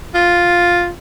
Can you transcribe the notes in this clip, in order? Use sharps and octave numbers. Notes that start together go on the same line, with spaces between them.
F4